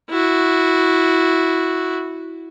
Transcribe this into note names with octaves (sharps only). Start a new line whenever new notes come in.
E4 F#4